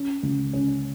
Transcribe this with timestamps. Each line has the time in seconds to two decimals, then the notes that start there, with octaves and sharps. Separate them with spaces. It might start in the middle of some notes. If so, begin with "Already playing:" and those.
Already playing: C#4
0.23 C#2
0.53 C#4